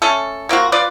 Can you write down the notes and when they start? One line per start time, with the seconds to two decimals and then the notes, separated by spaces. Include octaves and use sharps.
0.02 A3 C#4 A4
0.49 A#3 C4 F4 F#4
0.72 F4 B4 D5